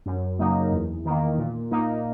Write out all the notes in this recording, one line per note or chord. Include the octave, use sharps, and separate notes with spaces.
F#2
C#3 F#3 A#3 D#4
E2
D#3 A#3
A#2
A#3 D#4